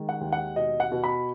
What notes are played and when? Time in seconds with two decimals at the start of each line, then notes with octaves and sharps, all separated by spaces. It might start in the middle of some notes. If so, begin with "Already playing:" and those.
Already playing: D#3 G#3
0.09 F#5
0.21 D#2
0.32 F#5
0.56 B2 D#5
0.80 F#5
0.92 B2
1.04 B5